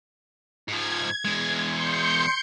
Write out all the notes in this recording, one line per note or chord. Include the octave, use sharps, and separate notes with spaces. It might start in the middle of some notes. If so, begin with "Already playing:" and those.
G#2 F3 G#6
E2 G#3
C6 G6 C#7